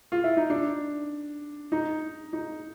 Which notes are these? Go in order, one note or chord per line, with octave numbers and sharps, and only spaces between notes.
F4
E4
D#4
D4
D#4
D#4